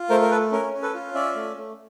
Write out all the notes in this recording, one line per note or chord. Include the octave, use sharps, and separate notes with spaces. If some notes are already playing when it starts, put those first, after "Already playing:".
Already playing: F4
A3 A#4 C5
A#4
A4 B4
C#4 A#4
C#4
A4 B4
F4
C#4 D5 E5
A3
A3